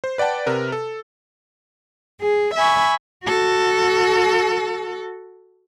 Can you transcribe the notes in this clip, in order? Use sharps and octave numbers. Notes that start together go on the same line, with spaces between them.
C5
B4 D5 F#5 G5 A5
C3 A#4 B4
A4
G#4
E5 G#5 B5 C#6
F#4 A4